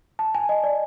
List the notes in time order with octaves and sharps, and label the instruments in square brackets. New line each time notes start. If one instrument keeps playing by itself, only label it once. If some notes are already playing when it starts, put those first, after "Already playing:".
[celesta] A5
G#5
D#5
D5